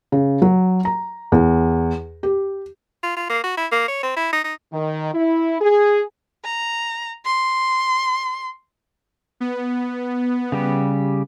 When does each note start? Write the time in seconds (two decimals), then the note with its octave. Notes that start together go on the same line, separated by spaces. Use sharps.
0.12 C#3
0.42 F#3
0.85 A#5
1.32 E2
2.23 G4
3.03 F4
3.17 F4
3.30 A#3
3.44 F#4
3.57 E4
3.72 A#3
3.88 C#5
4.03 C4
4.17 E4
4.33 D#4
4.44 D#4
4.73 D#3
5.14 E4
5.61 G#4
6.44 A#5
7.25 C6
9.40 B3
10.52 C#3 G3 G4